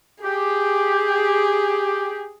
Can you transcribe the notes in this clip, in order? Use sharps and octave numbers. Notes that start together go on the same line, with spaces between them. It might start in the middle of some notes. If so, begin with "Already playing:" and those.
G4 G#4